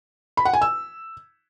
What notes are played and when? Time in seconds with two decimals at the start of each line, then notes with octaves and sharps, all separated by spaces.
0.37 B5
0.45 F#5
0.54 G#5
0.62 E6